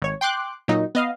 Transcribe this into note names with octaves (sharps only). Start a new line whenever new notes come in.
G#1 C#5
G5 C6 D6 F#6
A#2 F#3 D#4
B3 D#5 F5